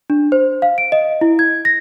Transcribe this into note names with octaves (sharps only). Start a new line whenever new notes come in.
D4
C5
F5
D7
D#5
E4
G#6
A#6